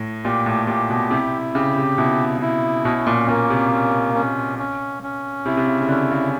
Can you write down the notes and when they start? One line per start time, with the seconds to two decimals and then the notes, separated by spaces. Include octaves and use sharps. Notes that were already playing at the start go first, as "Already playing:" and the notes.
Already playing: A2
0.25 A#2 G4
0.46 A2
0.67 A#2 G4
0.90 B2
1.11 C3 E4
1.54 C#3 G4
1.76 C3
1.98 B2 E4
2.42 E4
2.84 B2 C#4
3.07 A#2
3.28 A#2 A#3
3.50 C3
3.72 C#4
4.15 C#4
4.59 C#4
5.03 C#4
5.46 C3 E4
5.57 C3
5.67 C#3
5.81 C#3
5.89 D3 C#4
6.12 C#3